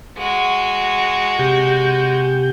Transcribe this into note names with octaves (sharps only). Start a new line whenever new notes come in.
G#3 F#4
C3 G4 G6